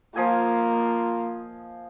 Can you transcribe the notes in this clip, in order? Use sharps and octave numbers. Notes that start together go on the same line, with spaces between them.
F3 A#3 F4 D#5 G#5